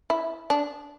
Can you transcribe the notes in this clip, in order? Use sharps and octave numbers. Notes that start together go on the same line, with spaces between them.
E4
D4